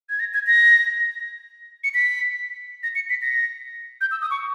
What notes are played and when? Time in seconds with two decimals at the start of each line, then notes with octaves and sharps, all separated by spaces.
0.10 G#6
0.20 A#6
0.34 G#6
0.46 A#6
1.84 C#7
1.94 B6
2.83 A#6
2.95 C#7
3.10 B6
3.22 A#6
4.01 G6
4.11 E6
4.21 D#6
4.31 C#6